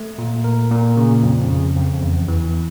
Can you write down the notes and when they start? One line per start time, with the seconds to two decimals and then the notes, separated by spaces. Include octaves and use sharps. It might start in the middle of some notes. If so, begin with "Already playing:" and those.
Already playing: A3
0.18 A#2
0.44 A#4
0.71 A#2
0.97 C#3
1.23 F2
1.50 C#3
1.76 F2
2.02 E2
2.28 E3